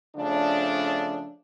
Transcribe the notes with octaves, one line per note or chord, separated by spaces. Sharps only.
C#3 F3 A3 D4